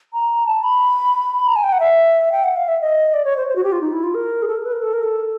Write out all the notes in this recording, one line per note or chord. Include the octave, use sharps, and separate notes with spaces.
A#5
A5
B5
A#5
G#5
G5
F#5
E5
G5
F#5
F5
E5
D#5
D5
C#5
C5
C5
F#4
G4
F4
D#4
E4
F4
A#4
G#4
A4
A#4
B4
A#4
A4
A#4
A4